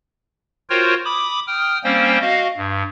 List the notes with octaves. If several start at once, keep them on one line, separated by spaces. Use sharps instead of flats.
F4 F#4 A#4 C5 C#5 G5
B5 D6 D#6
G5 D#6 F6
G3 A#3 C4 C#4 C5 G5
F#4 D#5 F5
G2